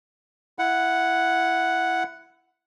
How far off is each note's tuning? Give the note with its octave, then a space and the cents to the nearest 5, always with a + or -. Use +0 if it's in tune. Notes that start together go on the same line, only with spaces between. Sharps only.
E4 +15 F#5 +0